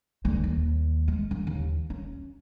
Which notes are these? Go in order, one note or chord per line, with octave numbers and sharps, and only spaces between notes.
D2
D#2
G#3
D3
D#2
C#4